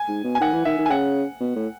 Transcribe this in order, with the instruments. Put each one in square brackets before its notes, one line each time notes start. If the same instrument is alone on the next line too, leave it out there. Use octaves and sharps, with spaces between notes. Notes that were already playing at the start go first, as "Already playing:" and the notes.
Already playing: [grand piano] G#5
[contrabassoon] G#2
B2
[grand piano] G#5
[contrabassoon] D#3 [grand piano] F#5
[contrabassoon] E3
[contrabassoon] D#3 [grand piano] E5
[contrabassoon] D#3
[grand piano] G#5
[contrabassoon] C#3 [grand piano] F#5
[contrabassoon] B2
A2